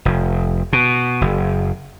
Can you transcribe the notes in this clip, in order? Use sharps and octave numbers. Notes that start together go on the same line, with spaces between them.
F1
B2
F#1